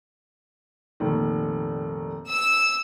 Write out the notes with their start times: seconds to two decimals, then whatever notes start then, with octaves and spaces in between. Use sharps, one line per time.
1.00 F1 A#2 D#3
2.28 E6